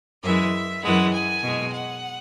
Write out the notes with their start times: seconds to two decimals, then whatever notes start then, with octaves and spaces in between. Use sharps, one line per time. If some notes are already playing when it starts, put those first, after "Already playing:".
0.23 F#2 E3 G#3 E5
0.82 F#2 E3 G#3 F#5
1.13 G#5
1.42 B2 G#3
1.72 F#5